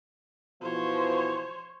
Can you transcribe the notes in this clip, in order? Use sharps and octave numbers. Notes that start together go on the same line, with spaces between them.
B2 E3 F3 C5 C#5